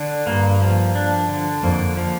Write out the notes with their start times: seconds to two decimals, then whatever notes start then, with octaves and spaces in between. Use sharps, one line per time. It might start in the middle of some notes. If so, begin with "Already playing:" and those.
Already playing: D3 D4
0.27 G2 A#3
0.61 F3
0.95 D4
1.29 D3
1.63 F2 A#3
1.97 F3